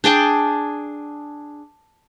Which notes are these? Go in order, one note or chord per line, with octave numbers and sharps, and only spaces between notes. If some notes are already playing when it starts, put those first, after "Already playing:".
D4 G#4 G5 A5